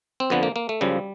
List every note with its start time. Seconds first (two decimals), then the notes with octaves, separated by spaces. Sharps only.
0.20 C4
0.30 F2 D3 F3 B3
0.43 A#3
0.56 A#3
0.69 A3
0.81 F#2 C#3 F3 G3